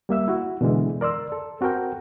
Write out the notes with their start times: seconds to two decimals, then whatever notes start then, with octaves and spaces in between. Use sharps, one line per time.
0.09 G3 A#3 E5 E6
0.28 E4 F#4
0.61 B2 D3 E3 G#3
1.01 A#4 D5 C6 E6
1.32 A4
1.61 C4 F#4 A4 A#4 G5